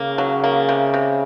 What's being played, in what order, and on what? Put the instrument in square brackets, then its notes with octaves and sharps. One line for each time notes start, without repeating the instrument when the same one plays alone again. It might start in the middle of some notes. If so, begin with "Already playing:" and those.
Already playing: [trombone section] C#3 [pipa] A#3
[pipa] F#3
A#3
C3
C3